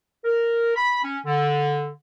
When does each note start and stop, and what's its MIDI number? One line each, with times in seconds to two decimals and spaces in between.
0.25 0.73 70
0.76 0.99 83
1.04 1.18 61
1.26 1.90 50